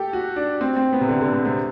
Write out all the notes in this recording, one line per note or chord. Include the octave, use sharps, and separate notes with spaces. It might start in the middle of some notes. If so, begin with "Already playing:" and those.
Already playing: G4 A4
F#4
D4
C4
C4
B3
C3
D3
D3
C3
C3